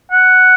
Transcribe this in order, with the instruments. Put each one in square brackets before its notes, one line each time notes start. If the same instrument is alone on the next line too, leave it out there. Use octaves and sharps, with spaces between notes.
[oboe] F#5